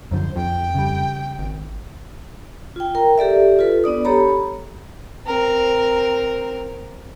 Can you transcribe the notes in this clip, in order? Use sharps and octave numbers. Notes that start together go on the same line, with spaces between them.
F#2 D3 F3 C5
F2 F3 G5
C#3 G3
G#1
F4 G5
A#4 G5 A#5
G4 A4 D5 E5
F4 A4 B4
B3 D4 D5 D#6
G4 A4 C#5 A#5 B5
C4 A#4